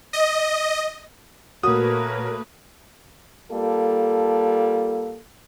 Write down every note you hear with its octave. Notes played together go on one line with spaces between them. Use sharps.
D#5
A#2 A3 A#3 F#4 A#4 B4 C#5 D#6
G3 A#3 F4 A4